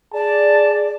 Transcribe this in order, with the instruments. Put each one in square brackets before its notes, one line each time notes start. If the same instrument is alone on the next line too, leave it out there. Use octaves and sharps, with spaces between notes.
[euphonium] G#4 [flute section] D5 [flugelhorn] A5